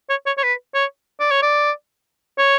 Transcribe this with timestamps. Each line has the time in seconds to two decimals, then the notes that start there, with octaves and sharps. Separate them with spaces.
0.10 C#5
0.26 C#5
0.38 C#5
0.43 B4
0.75 C#5
1.20 D5
1.31 C#5
1.42 D5
2.38 C#5